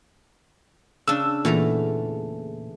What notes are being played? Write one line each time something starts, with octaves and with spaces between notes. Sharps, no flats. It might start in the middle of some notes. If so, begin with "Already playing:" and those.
C#3 D4 E6
E2 A#2 A3 A#5